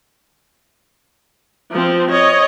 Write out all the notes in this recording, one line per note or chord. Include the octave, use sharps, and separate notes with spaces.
F3 C4
C#5 D#5